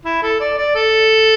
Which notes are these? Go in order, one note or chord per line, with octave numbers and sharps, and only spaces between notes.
E4
A4
D5
D5
A4